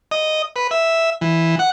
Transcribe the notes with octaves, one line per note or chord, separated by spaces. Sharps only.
D#5
B4
E5
E3
F#5